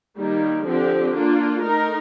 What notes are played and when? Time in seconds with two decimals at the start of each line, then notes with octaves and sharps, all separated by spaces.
0.17 D#3 G3 A#3
0.65 D3 F3 C4 G4
1.14 A#3 D4 F4
1.64 A3 D#4 A#4